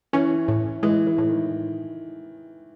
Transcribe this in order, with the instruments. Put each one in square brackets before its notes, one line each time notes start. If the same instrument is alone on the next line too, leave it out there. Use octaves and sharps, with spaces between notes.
[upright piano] E3 [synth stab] C#4
[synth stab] A2
[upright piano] E3 [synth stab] G#3
[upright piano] E3
[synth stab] A2
[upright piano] D#3